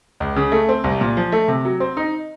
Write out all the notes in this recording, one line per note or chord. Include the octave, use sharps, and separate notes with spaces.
C#2
C#3
A3
C4
C2
A#2
F3
A3
C3
F#3
C4
D#4